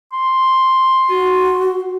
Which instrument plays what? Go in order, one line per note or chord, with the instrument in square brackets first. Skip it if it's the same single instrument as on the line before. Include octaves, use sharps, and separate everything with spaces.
[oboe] C6
[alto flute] F#4